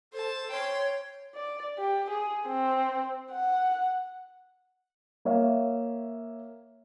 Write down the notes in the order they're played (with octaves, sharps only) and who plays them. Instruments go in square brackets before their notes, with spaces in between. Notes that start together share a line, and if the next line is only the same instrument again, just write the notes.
[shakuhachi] A4 [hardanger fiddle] C5 A5
[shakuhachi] C#5 [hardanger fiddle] G5 C6
[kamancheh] D5
G4
G#4
C4
F#5
[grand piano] A#3 C#5 E5 F5